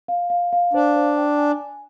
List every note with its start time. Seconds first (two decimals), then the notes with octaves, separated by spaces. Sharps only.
0.08 F5
0.30 F5
0.53 F5
0.73 D4 C5
0.96 C5
1.17 G5
1.38 G#5
1.60 G#5